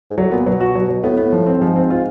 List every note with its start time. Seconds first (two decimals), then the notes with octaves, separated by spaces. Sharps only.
0.11 G#2
0.17 A2 F#3
0.31 A#2 B3
0.46 B2 F#3
0.60 F#4
0.75 F#3
0.89 F#3
1.04 A2 B3
1.17 B3
1.32 F3
1.46 C4
1.60 G#2 F3
1.76 C4
1.90 F4